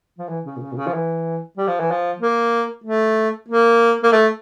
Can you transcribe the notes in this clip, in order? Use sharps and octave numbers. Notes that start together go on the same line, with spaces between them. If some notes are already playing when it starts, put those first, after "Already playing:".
F3
E3
C#3
A#2
C#3
A#2
C#3
F3
E3
G3
F3
E3
F3
A#3
A3
A#3
A#3
A3